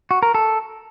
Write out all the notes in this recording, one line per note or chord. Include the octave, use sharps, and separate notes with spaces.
F#4
A#4
A4